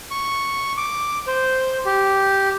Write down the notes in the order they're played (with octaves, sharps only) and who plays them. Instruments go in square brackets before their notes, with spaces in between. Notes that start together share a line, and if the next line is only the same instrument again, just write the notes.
[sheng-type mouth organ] C#6
D6
C5
G4